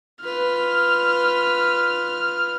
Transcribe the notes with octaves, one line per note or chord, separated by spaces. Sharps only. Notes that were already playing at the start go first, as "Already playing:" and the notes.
F4 B4 F6